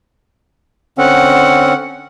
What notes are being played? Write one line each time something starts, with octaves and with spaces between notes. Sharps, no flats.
D3 C4 C#4 F#5